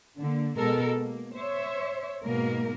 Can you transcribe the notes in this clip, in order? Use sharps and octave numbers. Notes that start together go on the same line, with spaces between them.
D3 A#3
B2 G#3 A4 A#4
A#3
C5 C#5 E5
G#2 B2 A#3 A#4